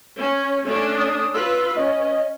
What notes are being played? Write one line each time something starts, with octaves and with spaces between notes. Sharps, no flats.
C#4
A3 C#4 D4
D#6
F4 B4 E6
C#4 D#5